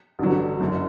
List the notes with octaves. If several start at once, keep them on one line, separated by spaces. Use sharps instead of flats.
A1 G2 D3 F#3
F#1 F#2 C#3